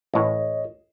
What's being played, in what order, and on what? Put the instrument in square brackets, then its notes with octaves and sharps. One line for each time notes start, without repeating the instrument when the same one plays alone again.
[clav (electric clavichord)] A1 A2 [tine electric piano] C#5 D#5